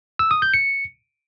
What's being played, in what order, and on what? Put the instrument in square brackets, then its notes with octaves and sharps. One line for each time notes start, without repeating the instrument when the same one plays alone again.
[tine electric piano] E6
D#6
G6
C#7